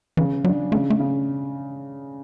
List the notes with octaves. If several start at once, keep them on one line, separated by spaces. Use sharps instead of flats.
C#3 E3
F#3 D4
C#3 A3
A3
C#3